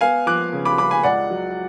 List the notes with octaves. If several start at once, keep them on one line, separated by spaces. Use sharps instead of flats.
B3 F5 G#5
F3 D6 F#6
C#3
B5 D6
C#3 B5 D6
G#5 B5
C#2 D5 F#5
F#3